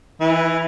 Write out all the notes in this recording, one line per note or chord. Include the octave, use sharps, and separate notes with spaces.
E3